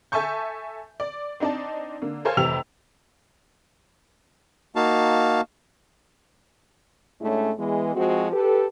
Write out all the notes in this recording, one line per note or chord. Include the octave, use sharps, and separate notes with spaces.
A4 E5 G#5 A5 C#6 G6
D5
C4 D4 D#4 D5 A5
D3 A#3
A4 A#4 C5 C#5 F5 G#5
F1 C3 E3 G4 E6 F7
A#3 D#4 F#4 F5 A5
A2 G#3 A3 C#4 D4 E4
E3 G#3 B3
F3 G#3 C4 F#4
G4 A4 B4